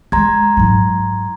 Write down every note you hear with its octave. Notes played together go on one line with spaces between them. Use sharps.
G#3 A#5 C6 G#6
G#2 F#3